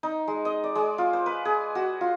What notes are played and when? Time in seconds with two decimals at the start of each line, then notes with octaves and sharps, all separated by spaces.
0.03 D#4
0.28 G#3
0.45 D#5
0.64 D5
0.75 G#3
0.98 F4
1.13 C5
1.26 B4
1.45 G#4
1.75 F#4
2.01 F4